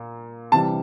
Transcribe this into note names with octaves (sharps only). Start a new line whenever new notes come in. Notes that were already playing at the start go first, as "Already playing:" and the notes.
Already playing: A#2
C3 E3 G3 A5